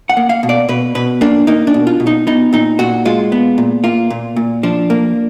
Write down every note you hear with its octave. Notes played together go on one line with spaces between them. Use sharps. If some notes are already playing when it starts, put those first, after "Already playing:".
F#5
A#3
F5
B2
D5
B2 B4
B2 B4
A#3 D4
A#3 D#4
D4
B2
F4
B2
D#4
B3 D#4
A#2 D#4
A#2 F#4
G#3 F4
B3
A#2
A#3 F4
A#2
A#2
F3 D4
A#3